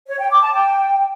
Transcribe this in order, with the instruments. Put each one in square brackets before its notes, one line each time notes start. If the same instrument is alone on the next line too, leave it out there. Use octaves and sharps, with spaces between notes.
[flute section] C#5
G5
D6
A5
G5